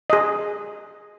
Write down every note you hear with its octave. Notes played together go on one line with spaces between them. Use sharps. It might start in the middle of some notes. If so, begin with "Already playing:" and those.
G#4 D#5